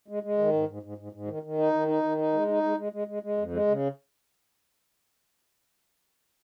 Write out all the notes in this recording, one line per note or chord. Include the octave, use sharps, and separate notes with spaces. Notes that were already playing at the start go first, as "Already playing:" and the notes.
G#3
G#3
D#3
G#2
G#2
G#2
G#2
G#2
D#3
D#3
D#4
D#3
D#4
D#3
D#4
G#3
D#4
G#3
G#3
G#3
G#3
G#3
F2
G#3
C#3